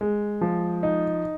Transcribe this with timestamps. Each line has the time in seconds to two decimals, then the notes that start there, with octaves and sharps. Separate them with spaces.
0.01 G#3
0.41 F3
0.83 D#4